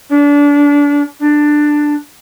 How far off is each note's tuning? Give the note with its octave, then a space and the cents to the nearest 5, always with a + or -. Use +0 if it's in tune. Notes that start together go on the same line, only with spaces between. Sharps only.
D4 -30
D4 +10